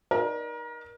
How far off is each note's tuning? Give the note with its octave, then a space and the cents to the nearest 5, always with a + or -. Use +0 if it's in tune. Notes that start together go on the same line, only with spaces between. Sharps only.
D#4 -5 A#4 +30 D5 +0